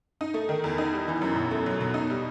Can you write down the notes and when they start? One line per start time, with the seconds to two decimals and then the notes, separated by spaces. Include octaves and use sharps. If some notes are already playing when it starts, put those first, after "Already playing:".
0.21 D#4
0.34 A3
0.49 D#3
0.64 E2
0.78 D#4
0.93 G3
1.08 E3
1.22 F#2
1.36 B2
1.51 A3
1.66 F#3
1.81 B2
1.94 D#4
2.10 G3